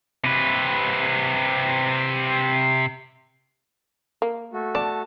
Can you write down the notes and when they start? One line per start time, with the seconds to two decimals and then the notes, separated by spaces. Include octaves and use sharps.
0.24 C3 B4
4.22 A#3
4.53 A3 F#4
4.75 D5 A5